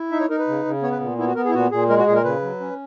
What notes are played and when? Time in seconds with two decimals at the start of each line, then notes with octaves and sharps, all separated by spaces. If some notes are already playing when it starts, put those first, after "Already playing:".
Already playing: E4
0.12 D#4 E5
0.20 C#5
0.30 D#4 A#4
0.39 B4
0.48 C#3
0.65 C#3
0.82 B3 C#5
0.92 B4
1.00 A#2
1.18 B3 E4
1.27 F#4
1.35 B3 A#4
1.45 G#4
1.49 E4
1.54 A#2 F#4
1.71 A#2 G#4
1.89 G#3 A#4
1.98 F#4
2.07 A#2 G#4
2.16 A#4
2.25 C#3 B4
2.42 F#3
2.60 C#4